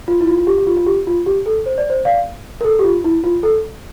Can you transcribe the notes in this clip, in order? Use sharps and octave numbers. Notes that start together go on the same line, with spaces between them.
F4
E4
F4
F4
G4
G4
F4
F4
G4
F4
G4
A4
C5
D5
C5
D5 F5
A#4
A4
G4
F4
E4
F4
A4